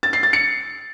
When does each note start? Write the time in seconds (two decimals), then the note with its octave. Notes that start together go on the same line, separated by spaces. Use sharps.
0.03 A6
0.13 C7
0.23 A6
0.33 C#7